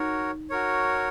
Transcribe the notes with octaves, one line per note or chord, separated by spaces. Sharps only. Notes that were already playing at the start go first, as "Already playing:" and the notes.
Already playing: D#4 F#4 A#4 C#5
F#4 A#4 C#5